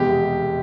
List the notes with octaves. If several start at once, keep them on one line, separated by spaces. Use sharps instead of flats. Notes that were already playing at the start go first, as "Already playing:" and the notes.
Already playing: F1 E2 B2 G#3 G4